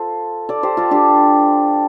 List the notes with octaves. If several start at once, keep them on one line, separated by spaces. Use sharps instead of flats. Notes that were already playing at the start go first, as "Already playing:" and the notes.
Already playing: F4 A4 C5 F5
A4 D5
G4 C5
F4 A4
D4 G4